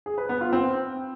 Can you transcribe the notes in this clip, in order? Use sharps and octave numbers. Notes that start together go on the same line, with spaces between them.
G#4
B4
B3
F4
C4